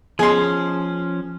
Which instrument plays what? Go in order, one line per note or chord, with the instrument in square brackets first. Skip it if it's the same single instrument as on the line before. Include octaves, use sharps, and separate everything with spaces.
[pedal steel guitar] F3 C#4 [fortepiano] G#4 C6